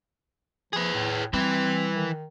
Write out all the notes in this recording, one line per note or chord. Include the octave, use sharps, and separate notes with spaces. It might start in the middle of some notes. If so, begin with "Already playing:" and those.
F3 G#4 B4
A2
E3 G3 C4 B4
D#3